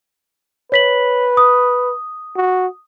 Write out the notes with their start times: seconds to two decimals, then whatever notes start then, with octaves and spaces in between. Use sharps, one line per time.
0.72 B4 C#5 B6 F#7
1.37 D#6
2.36 F#4